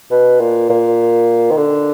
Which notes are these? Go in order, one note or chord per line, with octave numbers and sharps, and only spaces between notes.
B2
A#2
A#2
D#3
D3